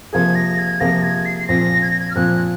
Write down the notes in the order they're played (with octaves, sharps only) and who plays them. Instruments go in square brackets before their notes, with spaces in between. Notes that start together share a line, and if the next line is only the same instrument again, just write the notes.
[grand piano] C3 F3 A#3 F4 G#4 [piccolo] G#6
[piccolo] A#6
G#6
[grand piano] C3 F3 A#3 F4 G#4 [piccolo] A#6
[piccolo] G#6
C7
C7
[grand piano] A#2 F3 C4 [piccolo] A#6
[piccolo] G#6
A#6
G#6
F6
[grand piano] A#2 F3 C4 [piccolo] F#6